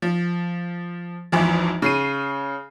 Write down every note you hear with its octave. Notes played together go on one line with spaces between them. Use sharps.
F3
G#1 E2 E3 F3
C#3 C7 D#7